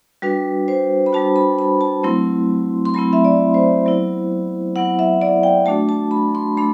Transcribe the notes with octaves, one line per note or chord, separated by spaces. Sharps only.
G3 D4 F#4 B4
C5
B5
G3 D4 F#4 A5
B5
B5
A5
F#3 A3 C4 E4 C6
C6
F#3 A3 C4 E4 B5
E5
D5
C5
F#3 B3 E4
F#3 B3 E4 F#5
E5
D5
G5
A3 D4 F#4 A5
A5
B5
C6
A3 D4 B5